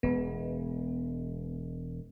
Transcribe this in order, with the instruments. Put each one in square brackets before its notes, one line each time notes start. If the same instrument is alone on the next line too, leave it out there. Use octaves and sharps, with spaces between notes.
[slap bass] E1 G#3 [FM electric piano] B3